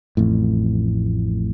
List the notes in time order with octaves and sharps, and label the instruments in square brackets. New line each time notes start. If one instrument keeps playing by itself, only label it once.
[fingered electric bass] A1 F2 A2